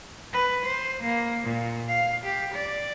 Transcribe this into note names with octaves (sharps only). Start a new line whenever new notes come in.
B4
C5
A#3
A#2
F5
G4
D5